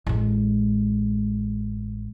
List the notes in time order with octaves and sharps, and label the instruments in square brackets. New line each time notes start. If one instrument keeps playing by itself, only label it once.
[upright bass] A1 G#3